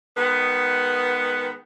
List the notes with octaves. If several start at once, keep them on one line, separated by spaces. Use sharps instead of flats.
D#3 G#3 B3